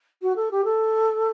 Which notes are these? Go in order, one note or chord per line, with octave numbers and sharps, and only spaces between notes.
F#4
A4
G4
A4